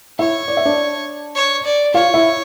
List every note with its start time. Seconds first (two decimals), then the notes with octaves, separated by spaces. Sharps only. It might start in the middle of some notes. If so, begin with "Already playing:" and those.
0.19 E4 C#5 E5
0.48 D5
0.57 E5
0.65 D4 D5
1.35 C#5
1.65 D5
1.94 F4 C#5 F5
2.14 E4 E5